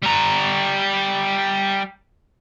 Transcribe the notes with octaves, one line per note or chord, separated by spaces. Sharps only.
G3 A#5